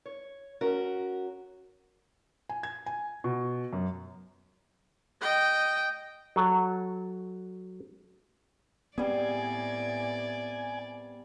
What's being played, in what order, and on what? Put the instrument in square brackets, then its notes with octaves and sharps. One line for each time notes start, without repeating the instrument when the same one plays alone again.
[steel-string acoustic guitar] C#5
C#4 F#4 A#4
[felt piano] G#5
G#6
G#5
B2
F#2
[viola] D#5 G5
[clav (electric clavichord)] F#3 A4
[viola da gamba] A2 D5 [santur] G3 G#4 [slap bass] B3 C4 [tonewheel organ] G#5